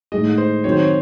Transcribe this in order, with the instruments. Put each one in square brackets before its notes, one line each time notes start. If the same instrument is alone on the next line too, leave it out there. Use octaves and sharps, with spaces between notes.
[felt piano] A2 G#3 D#4 G#4 [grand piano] D#5
[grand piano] C5
[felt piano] D#3 F#3 C4 [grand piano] C#5
[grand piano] C5
C#5